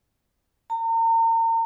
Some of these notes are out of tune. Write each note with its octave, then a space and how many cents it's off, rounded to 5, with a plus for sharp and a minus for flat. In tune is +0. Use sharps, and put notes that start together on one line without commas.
A#5 -40